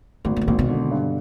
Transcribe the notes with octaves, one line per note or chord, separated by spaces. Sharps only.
G#1 A2
A#2
A2
G#1 A#2
B2
D3
G2